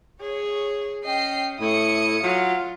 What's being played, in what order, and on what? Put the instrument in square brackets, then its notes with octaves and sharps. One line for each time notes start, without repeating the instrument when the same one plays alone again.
[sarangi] G#4 [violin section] C#5
[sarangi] C#4 [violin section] D#5 G5 C7
[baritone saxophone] A2 [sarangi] E4 [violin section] D#6 C#7
[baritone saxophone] F#3 [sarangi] F4